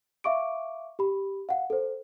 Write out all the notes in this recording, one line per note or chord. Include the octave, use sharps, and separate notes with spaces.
E5 F5 C#6 D6 D7
G4 B5
F5 F#5
A4 C5